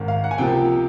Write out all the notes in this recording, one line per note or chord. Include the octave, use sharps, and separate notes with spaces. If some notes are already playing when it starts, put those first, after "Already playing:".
Already playing: G#1 G#2 D#3
F5
F#5
G#5
C#2 C3 F3 A#3 G5